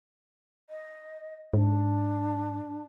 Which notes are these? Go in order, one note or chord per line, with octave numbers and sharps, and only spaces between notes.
D#5
G#2 D4